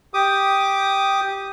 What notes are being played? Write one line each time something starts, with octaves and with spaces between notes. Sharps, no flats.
G4 D6 D#6